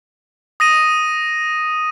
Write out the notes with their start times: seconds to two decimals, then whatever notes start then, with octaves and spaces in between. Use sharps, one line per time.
0.60 D#6 A#6 D#7